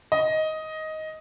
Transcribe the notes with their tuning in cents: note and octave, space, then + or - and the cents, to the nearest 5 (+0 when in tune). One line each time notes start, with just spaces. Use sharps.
D#5 +10